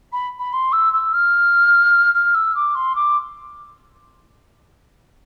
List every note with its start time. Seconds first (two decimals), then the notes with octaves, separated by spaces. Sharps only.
0.12 B5
0.39 B5
0.53 C6
0.72 E6
0.93 E6
1.13 F6
2.14 F6
2.34 E6
2.55 D6
2.75 C6
2.95 D6